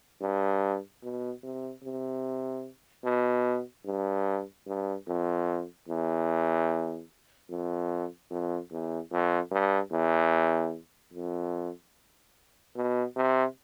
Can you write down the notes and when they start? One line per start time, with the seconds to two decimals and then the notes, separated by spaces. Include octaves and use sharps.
0.22 G2
1.03 B2
1.43 C3
1.84 C3
3.05 B2
3.86 G2
4.67 G2
5.08 F2
5.88 E2
7.50 F2
8.31 F2
8.71 E2
9.12 F2
9.51 G2
9.92 E2
11.13 F2
12.76 B2
13.16 C3